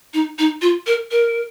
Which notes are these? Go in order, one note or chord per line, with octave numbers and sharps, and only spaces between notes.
D#4
D#4
F4
A#4
A#4